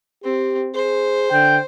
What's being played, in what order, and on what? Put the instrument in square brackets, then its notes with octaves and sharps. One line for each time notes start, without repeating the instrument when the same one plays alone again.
[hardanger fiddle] C4 [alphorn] G4
[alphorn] G#4 [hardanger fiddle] C5
[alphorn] D3 [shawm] G5